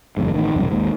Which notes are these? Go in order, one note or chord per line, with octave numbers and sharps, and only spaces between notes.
F#1 E2 G#2
A1 D3 D#3
E1 C2 F#2
G#1 D#2 G#2